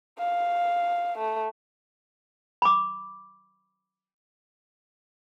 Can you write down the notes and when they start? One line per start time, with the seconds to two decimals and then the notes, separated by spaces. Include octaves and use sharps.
0.19 F5
1.18 A3
2.62 B5 D6